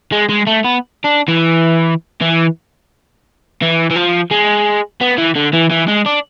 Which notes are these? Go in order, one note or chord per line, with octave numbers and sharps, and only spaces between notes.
G#3
G#3
A3
B3
D4
E3
E3
E3
E3
F3
G#3
B3
E3
D3
E3
E3
G#3
D4